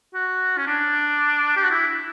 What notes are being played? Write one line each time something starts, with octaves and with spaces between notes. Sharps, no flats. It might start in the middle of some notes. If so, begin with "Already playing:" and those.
F#4
C#4
D4
G4
F#4
E4